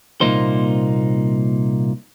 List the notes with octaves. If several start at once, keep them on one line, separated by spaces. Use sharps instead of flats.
C2 A#2 A#3 D#4 C5